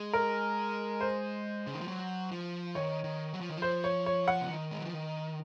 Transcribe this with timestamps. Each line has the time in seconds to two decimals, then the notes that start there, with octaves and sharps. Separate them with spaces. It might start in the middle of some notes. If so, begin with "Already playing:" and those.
Already playing: G#3
0.13 A#4
1.01 C5
1.67 C#3
1.74 D#3
1.81 F3
1.88 F#3
2.31 F3
2.75 D#3 C#5
3.04 D#3
3.33 F#3
3.41 F3
3.49 D#3
3.57 F3 C5
3.84 C#5
4.06 C#5
4.28 F#5
4.41 C#3
4.49 D#3
4.71 G#3
4.79 F#3
4.85 F3
4.93 D#3